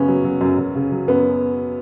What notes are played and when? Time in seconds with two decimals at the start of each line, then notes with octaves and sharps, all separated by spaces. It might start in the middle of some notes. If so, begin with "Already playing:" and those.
Already playing: F#2 C#3 B3 C#4
0.08 F#3
0.24 F#3
0.41 F#2
0.58 F#2
0.75 C#3
0.92 F#3
1.08 F#2 B3